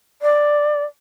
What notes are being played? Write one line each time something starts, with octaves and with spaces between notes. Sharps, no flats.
D5